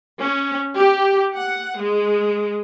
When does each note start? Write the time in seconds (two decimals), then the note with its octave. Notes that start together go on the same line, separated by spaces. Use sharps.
0.19 C#4
0.77 G4
1.34 F#5
1.80 G#3